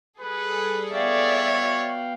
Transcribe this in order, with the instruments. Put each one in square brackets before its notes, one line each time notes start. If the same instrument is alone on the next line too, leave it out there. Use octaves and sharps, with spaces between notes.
[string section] G3 G#4 A4 [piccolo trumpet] B4
[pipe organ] B3 F5 G5 [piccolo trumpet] C#5 [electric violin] D5 E5
[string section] F#4